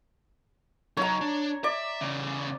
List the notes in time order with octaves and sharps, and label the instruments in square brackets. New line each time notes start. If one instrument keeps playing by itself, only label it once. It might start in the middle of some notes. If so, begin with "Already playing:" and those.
[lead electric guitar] F#3 D#4 [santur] C#5 A#5
[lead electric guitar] D4
[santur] D5 [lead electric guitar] E5
[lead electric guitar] E2 C#3